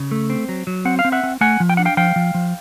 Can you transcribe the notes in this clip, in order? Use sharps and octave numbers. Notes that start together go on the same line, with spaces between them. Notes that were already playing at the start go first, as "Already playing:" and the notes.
Already playing: C#3
A3
C4
F#3
F#3
C4 F#5
F5
C4
E5 F#5
C4
A3 F#5 G#5
F3
G5
D4 F#5
F5 G5
F3 F5 G5
F3
F3